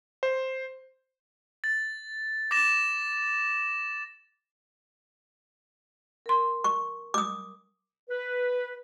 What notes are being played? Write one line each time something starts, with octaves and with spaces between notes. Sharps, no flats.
C5
A6
D6 A6 A#6 E7
A#4 C6
C#6
D6 D#6
B4